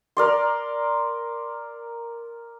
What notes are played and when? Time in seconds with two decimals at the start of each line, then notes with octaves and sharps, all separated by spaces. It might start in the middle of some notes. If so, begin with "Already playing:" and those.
0.17 A#4 D5 C6